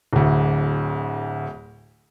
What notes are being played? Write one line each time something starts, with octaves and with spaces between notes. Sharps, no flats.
D1 D2